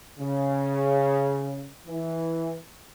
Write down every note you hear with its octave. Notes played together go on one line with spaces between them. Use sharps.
C#3
E3